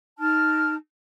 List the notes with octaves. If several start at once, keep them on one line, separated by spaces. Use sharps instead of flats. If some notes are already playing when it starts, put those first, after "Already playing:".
D#4 A5 F6